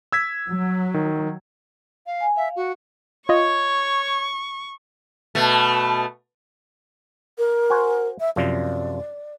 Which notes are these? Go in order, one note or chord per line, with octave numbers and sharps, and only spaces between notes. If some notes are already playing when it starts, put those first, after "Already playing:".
E6 G#6 B6
F#3
D#3
F5
G#5
E5 F5
F#4
F4 C#5 D#5 C#6
B2 A3
A#4
F#4 C5 G#5
E5
F#2 C3 F3 D5